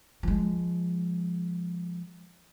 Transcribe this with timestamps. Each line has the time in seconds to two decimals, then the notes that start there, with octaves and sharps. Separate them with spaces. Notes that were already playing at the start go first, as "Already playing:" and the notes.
0.23 F3 G#3